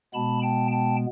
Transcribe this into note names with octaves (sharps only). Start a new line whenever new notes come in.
B2 G#3 B3 A5 B5
G5 A5
G5 A5